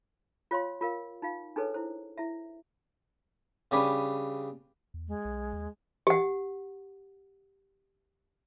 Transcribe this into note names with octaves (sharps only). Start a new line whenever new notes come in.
F4 C#5 F5 C6
F4 A#4 F5
D#4 F4 F5
D4 D#4 G#4 A4 B4 C#5
E4 C5
E4 E5
C#3 G3 D4 B4 G#5
E2
G#3
B1
D#2
G4 F#5